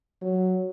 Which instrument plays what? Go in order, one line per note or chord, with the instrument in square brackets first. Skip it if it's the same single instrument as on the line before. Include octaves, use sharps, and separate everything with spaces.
[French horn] F#3